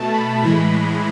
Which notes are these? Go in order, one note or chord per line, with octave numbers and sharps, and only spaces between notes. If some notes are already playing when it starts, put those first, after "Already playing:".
Already playing: B2 A3 A5
B5
A2 E3 G#3